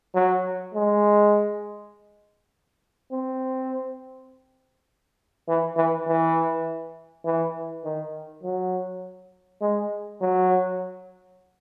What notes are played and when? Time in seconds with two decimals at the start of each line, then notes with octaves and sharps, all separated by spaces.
0.15 F#3
0.74 G#3
3.11 C4
5.48 E3
5.77 E3
6.08 E3
7.25 E3
7.84 D#3
8.43 F#3
9.61 G#3
10.21 F#3